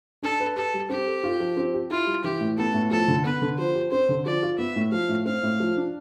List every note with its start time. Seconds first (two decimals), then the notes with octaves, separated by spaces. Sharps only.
0.23 D4 A4
0.40 B4
0.56 G4 A4
0.74 G3
0.89 C4 G4
1.06 A4
1.24 F4
1.40 F3
1.57 C4
1.74 G4
1.90 E4 F4
2.07 G3
2.24 E3 G4
2.40 A2
2.58 B3 A4
2.74 A2
2.91 F3 A4
3.08 D3
3.25 B3 B4
3.42 D3
3.58 F3 C5
3.75 G4
3.91 C4 C5
4.09 D3
4.26 F3 D5
4.43 F4
4.58 B3 E5
4.76 A2
4.92 F3 F5
5.09 A2
5.25 C4 F5
5.43 A2
5.60 F3
5.77 D4